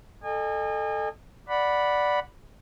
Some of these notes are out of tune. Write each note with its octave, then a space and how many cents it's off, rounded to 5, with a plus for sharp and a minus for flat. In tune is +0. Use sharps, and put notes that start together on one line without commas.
A4 +0 D#5 -30 G#5 -35
D5 +0 F#5 -5 B5 -5